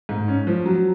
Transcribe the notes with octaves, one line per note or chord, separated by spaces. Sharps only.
G#2
C#4
F3
F#3